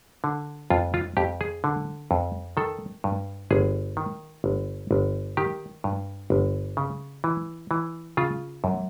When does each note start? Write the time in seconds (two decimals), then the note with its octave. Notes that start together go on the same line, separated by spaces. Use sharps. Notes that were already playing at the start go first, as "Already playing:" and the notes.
0.24 D3
0.70 F2 F4
0.94 F4
1.17 F2 G4
1.41 G#4
1.64 D3
2.11 F2
2.57 D#3 A4
3.04 G2
3.51 G1 G#4
3.97 D#3
4.44 G1
4.91 G1
5.37 D#3 G4
5.84 G2
6.30 G1
6.77 C#3
7.24 E3
7.71 E3
8.17 C#3 F4
8.64 F#2